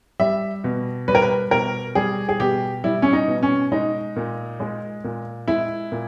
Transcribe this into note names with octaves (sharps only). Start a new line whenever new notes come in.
G3 E5
B2
G3 B4
A#4
B4
B2 A#4
G3 G#4
G#4
B2 G4
G3 E4
C#4
D#4
B2
C#4
G#3 D#4
A#2
G#3
A#2
G#3 E4
A#2